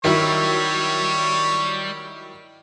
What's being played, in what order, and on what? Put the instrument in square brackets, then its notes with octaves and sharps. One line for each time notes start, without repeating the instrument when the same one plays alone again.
[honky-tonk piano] D#3 F#3 E4 [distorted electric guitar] G3 [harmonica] C#5